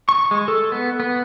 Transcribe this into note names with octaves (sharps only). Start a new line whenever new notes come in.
C#6
G#3
A4
B3
B3